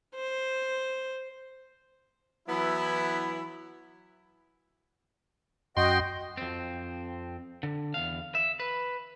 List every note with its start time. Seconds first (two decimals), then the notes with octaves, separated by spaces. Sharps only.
0.15 C5
2.48 E3 F#3 B3 E4
5.77 F#2 F#4 D#5 G5 C6
6.37 F2 C4
7.63 D3
7.94 E2 F5
8.35 E5
8.60 B4